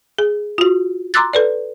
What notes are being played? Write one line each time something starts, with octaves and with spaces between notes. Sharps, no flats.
G#4
F4 F#4
A#5 C6 D6 E6 F#6 A6
A4 B4 D5